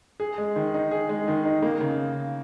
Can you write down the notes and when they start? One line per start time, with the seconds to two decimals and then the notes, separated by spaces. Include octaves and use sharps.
0.20 G#4
0.38 G#3
0.56 D#3
0.74 D#4
0.91 G#4
1.09 G#3
1.28 D#3
1.45 D#4
1.62 A#3
1.80 C#3